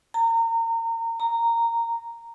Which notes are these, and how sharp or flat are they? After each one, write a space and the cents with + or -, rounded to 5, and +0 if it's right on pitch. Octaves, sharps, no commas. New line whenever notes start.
A#5 -30
A#5 -10